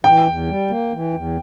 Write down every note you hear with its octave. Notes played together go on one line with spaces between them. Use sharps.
E3 G5
E2
G3
A#3
E3
E2